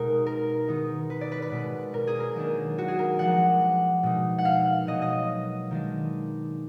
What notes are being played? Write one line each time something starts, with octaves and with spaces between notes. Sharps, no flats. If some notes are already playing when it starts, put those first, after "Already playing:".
Already playing: B2 G#3 D#4 G#4 A#4
A#4
D#3 G#3 B3 D#4
B4
D5
B4
B4
B2 G#3 B3
A#4
G#4
A#4
D#3 F#3 A#3 D4
F#4
G#4
A#4
F3 G#3 D4 F#5
B2 G#3 D#4
F#5
F5
B2 F#3 A#3 D#5
D#5
D#3 G#3 D4